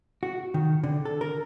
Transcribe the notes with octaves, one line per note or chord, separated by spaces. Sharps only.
F#4
D#3
D3
A4
A#4